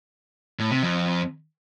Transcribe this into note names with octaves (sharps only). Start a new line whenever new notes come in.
A2
C3
F2